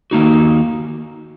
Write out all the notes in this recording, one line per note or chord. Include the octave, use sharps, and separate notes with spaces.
D#3 A#3 D#4 F#4